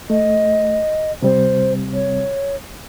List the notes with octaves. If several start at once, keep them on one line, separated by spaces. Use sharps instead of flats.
A3 D#5
C3 G3 C4 C5
C#5